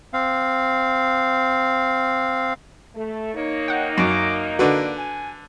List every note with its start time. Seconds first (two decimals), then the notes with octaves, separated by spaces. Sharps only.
0.13 C4 F5
2.95 A3
3.35 A#3 D#4 C#5
3.68 F#5 G5
3.98 F#2 D6
4.59 D3 F#4 B4 D5
4.97 G#5